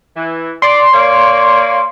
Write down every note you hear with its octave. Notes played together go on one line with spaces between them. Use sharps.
E3
D5 C6
A#3 C#5 D5